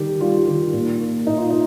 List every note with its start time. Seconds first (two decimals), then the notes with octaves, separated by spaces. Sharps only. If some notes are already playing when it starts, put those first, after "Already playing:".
Already playing: D#3 G3 G4
0.21 G3 F4
0.46 D#3
0.73 A#2
1.01 A#3
1.27 A#2 D#4
1.38 F4
1.50 D#4